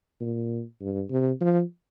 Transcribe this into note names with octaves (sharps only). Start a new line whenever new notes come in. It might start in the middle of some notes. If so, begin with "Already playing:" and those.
A#2
G2
C3
F3